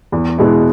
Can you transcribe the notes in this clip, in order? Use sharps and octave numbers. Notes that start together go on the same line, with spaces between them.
E2
B2 G#3 B3 E4